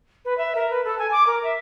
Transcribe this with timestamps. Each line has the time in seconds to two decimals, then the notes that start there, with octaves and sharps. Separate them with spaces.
0.25 B4
0.38 E5
0.55 A#4
0.70 B4
0.84 A4
0.99 G#5
1.12 D6
1.27 A#4
1.43 E5